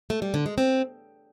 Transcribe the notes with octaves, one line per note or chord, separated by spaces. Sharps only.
A3
G3
D3
G#3
C4